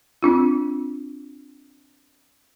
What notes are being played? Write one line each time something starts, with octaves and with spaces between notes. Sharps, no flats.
C4 D4 F4